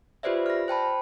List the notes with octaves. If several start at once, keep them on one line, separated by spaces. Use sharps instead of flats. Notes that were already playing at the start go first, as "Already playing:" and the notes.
F4 G4 B4 C5 D5 E5
F6 A#6
C5 G5 A5 B5